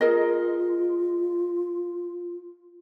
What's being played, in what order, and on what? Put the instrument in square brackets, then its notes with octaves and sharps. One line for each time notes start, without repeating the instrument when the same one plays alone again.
[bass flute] F4 [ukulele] G#4 A#4 D#5